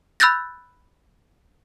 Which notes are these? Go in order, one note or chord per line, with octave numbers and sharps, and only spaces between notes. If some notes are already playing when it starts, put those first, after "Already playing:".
B5 E6 F#6 G6 A6 A#6